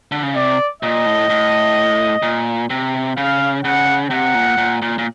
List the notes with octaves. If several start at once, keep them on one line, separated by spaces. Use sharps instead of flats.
D3
C#3
C3 D5
A#2 D#5
A2
A2
A#2
C3
C#3 F5
C#3 F#5
C3 F#5
A#2
A#2
A#2
A#2